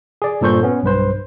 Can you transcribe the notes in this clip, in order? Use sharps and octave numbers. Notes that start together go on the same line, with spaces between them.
G#4 D5
G2 A#2 A4 C5 C#6 G6
B3 C#4
B1 G2 B4 C5